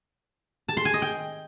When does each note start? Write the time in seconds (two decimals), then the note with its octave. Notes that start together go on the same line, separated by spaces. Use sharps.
0.68 A5
0.77 C6
0.85 G#5
0.94 D#5
1.02 G5